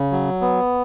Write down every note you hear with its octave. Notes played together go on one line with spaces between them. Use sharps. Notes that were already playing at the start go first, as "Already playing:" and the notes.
Already playing: C#3
F#3
B3